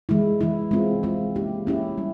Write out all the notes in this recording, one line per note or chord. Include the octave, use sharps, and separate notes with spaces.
E3 G#3 E4
E3 G#3 E4
G#3 C4 F4
G#3 C4 F4
A#3 C#4 E4 G4
A#3 C#4 E4 G4
G3 C#4